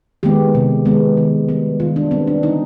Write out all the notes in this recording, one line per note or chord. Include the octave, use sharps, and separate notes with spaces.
D#3 G#3 B3 G4
C3
D#3 G#3 B3
D#3
G3 B3
D#3 F4
D4
G3 B3 C4
D4
D3 D#4